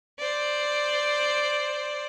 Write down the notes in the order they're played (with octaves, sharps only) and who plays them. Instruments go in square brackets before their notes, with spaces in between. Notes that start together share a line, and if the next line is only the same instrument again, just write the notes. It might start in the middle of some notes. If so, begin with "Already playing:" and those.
[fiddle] C5 D5